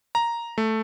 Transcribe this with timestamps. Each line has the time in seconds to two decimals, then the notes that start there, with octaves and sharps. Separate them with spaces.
0.15 A#5
0.58 A3